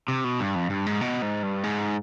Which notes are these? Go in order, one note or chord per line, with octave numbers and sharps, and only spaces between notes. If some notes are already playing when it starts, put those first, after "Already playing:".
C3
B2
G2
F2
G2
G#2
B2
G#2
G2
G#2